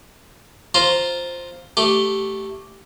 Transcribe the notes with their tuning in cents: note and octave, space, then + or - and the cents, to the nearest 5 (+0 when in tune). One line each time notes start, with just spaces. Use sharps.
F4 +0 C5 +5 A#5 +0
A3 +0 G4 -10